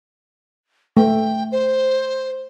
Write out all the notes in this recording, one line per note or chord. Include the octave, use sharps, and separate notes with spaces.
A3 G5
C5